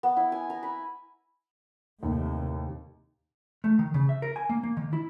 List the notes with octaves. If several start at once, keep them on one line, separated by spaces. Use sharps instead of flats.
B3
E4
G#5
A#5
B5
D#2 A2 C3 D#3
A3
D#3
C#3
E5
A#4
G#5
A#3
A#3
D#3
E4